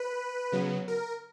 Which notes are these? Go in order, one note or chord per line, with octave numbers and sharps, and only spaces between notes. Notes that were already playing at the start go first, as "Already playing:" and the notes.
Already playing: B4
C#3 F#3 B3
A#4